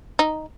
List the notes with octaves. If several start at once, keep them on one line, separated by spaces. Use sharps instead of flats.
D#4